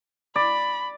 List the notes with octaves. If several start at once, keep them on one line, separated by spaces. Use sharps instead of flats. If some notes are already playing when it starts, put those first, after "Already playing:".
D5 B5